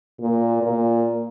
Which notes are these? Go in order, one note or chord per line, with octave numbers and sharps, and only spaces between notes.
A#2
A#2